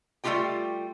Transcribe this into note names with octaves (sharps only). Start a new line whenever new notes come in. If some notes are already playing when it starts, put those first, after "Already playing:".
G3 A3 A#3 F4 G4 G5